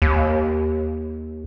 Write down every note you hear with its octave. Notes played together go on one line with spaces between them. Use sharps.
D#2